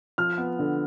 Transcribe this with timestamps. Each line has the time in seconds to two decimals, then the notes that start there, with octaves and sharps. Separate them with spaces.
0.18 F3 F6
0.38 B3
0.59 D3